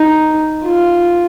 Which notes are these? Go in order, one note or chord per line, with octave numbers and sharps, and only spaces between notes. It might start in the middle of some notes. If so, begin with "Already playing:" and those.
Already playing: D#4
F4